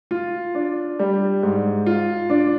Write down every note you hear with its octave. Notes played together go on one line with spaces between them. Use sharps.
F4
D4
G3
G#2
F4
D4